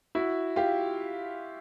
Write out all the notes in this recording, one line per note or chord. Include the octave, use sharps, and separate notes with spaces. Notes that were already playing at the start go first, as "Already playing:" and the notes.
E4 F#4
F4 G4